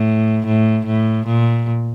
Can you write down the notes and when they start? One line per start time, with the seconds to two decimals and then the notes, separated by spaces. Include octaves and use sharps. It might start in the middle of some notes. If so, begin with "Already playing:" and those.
Already playing: A2
0.46 A2
0.86 A2
1.27 A#2